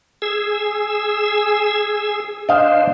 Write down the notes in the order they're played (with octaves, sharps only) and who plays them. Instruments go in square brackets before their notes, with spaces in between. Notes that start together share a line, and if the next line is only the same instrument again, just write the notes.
[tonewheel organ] G#4 E6
[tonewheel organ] D4 C5 [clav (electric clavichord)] D#5 F5